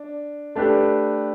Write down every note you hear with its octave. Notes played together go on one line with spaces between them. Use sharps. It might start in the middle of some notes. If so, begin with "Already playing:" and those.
Already playing: D4
A3 D4 G4 B4